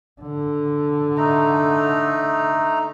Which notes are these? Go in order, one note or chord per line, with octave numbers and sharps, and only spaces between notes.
D3
A3 D#4 A#5